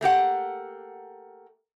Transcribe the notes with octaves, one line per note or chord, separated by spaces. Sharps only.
A3 A#3 G4 F#5